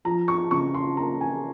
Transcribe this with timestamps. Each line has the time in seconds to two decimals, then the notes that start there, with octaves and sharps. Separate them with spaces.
0.05 F3 A#5
0.28 C#6
0.51 C#3 C#6
0.74 C6
0.97 A#3 A#5
1.21 G#5